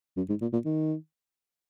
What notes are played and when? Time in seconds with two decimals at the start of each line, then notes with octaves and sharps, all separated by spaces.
0.17 F#2
0.29 G#2
0.41 A#2
0.53 A#2
0.65 D#3